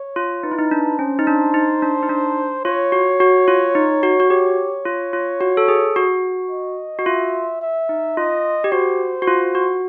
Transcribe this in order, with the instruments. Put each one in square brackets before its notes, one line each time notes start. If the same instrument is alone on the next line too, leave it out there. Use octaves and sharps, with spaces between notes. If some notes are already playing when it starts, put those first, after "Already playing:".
Already playing: [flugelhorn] C#5
[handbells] F4
[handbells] D#4 [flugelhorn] B4
[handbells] E4
D#4
D4
[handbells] C#4 [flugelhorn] C5
[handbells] D#4
D4
D#4
D4
D#4
D4
[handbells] F4 [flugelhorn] C#5
[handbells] F#4
F#4
F4
D#4
F#4
F#4
[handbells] G4 [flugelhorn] C#5
[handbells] F4
F4
F#4
A4
G#4
F#4
[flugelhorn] D#5
[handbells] F#4
[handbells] F4 [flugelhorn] E5
[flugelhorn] E5
[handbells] D#4
[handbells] F4 [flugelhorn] D#5
[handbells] G4
[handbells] F#4 [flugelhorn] C5
[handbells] F#4
F4
F#4